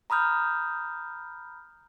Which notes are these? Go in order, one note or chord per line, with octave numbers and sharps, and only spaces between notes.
A#5 B5 D#6 F6 G6